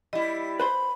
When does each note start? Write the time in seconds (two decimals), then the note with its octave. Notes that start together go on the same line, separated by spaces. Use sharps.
0.13 G3 E4 D#5
0.60 B4 C5 B5 C6